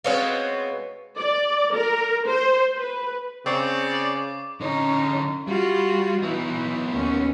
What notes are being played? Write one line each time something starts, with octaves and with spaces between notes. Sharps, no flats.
B2 G#3 B3 C4 C#5 F5
D5
A#4
C5
B4
C#3 C4 C#5 D5 C#6 D6 C7
D3 C#4 D#4 C#5
G3 F4 F#4
E3 B3 D#4
D#2 C#4